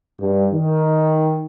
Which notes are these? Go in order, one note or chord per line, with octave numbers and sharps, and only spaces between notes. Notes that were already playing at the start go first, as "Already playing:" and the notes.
G2
D#3